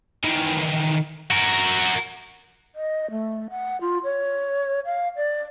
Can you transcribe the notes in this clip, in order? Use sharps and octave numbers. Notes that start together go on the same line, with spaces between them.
D#3 E3
F#4 A#4
D#5
A3
F#5
F4
C#5
F5
D5